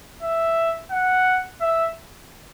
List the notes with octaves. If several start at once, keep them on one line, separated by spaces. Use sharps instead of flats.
E5
F#5
E5